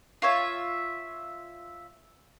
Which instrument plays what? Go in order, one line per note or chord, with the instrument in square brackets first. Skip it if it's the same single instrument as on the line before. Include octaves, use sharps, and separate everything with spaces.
[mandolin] F4 C#5 E5